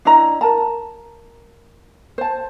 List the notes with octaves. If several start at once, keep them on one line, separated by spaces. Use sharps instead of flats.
D4 E4 D#5 A#5
A#4 A5 A#5
C5 A5